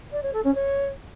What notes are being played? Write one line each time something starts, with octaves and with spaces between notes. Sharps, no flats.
D5
C#5
A4
C#4
C#5